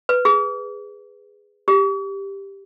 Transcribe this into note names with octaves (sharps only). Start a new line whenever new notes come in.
B4
G#4
G4